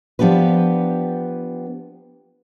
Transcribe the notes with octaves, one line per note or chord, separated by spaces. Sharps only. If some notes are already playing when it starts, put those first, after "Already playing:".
F3 B3 D4 G4 B4